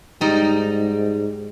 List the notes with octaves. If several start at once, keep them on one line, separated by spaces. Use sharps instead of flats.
G#2 G3 D#4